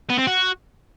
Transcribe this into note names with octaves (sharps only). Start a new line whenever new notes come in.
B3
C4
F#4